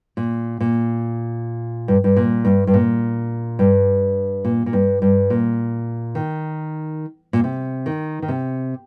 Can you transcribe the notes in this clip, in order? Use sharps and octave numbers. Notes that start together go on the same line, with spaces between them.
A#2
A#2
G2
G2
A#2
G2
G2
A#2
G2
A#2
A#2
G2
G2
A#2
D#3
A#2
C3
D#3
D#3
C3